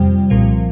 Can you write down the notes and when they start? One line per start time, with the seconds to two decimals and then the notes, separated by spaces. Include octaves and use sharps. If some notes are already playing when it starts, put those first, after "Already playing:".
Already playing: F2 C3 G3
0.30 C2 A#2 F3